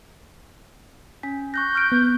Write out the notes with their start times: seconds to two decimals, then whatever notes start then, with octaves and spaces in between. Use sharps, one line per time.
1.23 C#4 G#5 B6
1.54 C#6 F#6 G6 A#6
1.75 F6 F#6 D7
1.92 B3